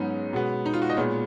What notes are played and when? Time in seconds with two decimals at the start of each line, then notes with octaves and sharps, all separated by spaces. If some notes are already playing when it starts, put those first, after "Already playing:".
Already playing: G#2 F#3 B3 C#4 D#4
0.33 B2 G#3 B3
0.66 D#4
0.74 F4
0.82 F#4
0.90 D#5
0.97 A#2 G#3 B3 C#5